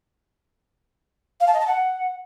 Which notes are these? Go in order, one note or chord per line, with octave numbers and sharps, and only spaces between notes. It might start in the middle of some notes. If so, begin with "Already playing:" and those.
F5
A5
D#5
A5
F#5